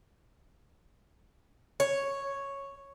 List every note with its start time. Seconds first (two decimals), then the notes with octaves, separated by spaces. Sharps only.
1.80 C#5